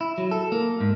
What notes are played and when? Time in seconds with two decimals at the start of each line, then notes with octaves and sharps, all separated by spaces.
0.01 E4
0.18 F#3
0.31 A4
0.52 A#3
0.80 G#2